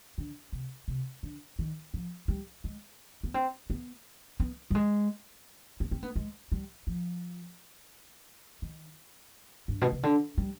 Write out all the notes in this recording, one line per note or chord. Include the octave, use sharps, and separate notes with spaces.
D3
C3
C3
D3
D#3
F3
G3
G#3
B3
C4
B3
B3
G3
G#3
B3
C4
B3
G#3
G3
F3
D#3
G2
B2
C3
D3
G3